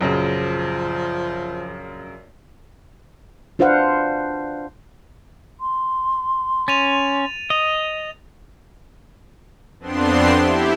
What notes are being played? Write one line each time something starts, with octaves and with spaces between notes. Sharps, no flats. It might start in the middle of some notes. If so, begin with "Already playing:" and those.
A#1 F#2 C#3 F3
D4 F4 B4 C5 F5 F#5
C6
C#4 A6 D#7 F7
D#5 F7
F2 B3 C4 D4 C6
E4 G4